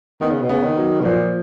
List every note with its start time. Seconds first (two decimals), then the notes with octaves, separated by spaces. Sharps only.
0.21 D#3 B3
0.31 C#3
0.41 B2
0.49 C#3 B3
0.63 D#3
0.77 F#3
1.00 B2
1.04 A#2 F3